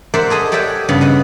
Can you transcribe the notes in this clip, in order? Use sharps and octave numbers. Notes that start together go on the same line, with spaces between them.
A#4 C5 D5 E5 F#5 C6
G#4 A4 D#5
G4 C#5 D5 E5 F#5 G5
G2 C#3 B3
D#5 F#5